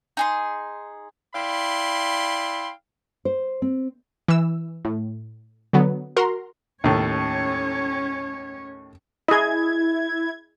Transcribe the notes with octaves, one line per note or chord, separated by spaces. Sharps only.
D#4 G#4 C6
E4 D5 F5 G5 B5 C6
C5
C4
E3 E6
A2
D3 F#3 B3
F#4 A#4 A#5 C6
D#2 A2 C#4 C#5
E4 G#4 D#5 G#6